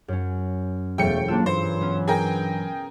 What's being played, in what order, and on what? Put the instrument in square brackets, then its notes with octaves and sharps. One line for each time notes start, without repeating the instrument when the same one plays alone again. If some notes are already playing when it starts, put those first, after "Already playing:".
[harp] F#2 C#4
[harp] E1 F#3 A4 [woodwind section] E2 A3 [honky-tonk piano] G5 C#7
[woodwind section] A#3 D4 [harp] F4 E6
[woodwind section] G2 E3 F#3 [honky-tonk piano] C5
[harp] B3 C#4
[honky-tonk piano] G#4 A#4 G5